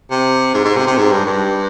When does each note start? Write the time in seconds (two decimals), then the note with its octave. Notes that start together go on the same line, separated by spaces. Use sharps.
0.11 C3
0.54 G#2
0.65 G#2
0.76 C3
0.87 C3
0.98 G#2
1.12 G2
1.25 G2